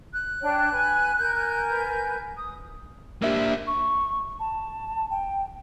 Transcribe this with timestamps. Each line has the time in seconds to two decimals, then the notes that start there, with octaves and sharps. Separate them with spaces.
0.13 F#6
0.42 D4 C#5 G5
0.71 B4 G#5
1.19 A#4 G#5 G6
1.69 B4
2.37 D#6
3.22 A#3 D4 G4 E5 E6
3.67 C#6
4.40 A5
5.10 G5